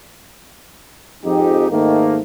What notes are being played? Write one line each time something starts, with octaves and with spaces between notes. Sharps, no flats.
F2 G#2 D#4 G4
G#2 D#3 A3 A#3